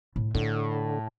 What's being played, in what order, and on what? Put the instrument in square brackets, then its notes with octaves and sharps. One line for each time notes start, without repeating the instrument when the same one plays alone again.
[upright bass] A2
[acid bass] A2 [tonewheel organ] D3 [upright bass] F4